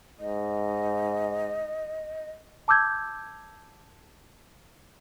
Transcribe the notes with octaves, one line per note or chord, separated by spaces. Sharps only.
G#2 D#5
A5 D6 E6 G6 G#6